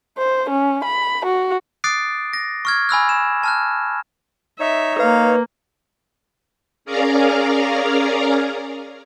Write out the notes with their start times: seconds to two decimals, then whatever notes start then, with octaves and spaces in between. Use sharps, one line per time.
0.18 C5
0.49 C#4
0.84 B5
1.25 F#4
1.84 D6 D#6 F#6 A6 C7 D7
2.33 A#6
2.65 C#6 F6 G#6
2.89 G#5 B5 E6 F#6
3.09 E7
3.43 A5 F6 F#6
4.60 D#4 C#5 E5
4.99 A#3 B4 F5
6.85 C#4 G#4 A#4 D5 F5 A#5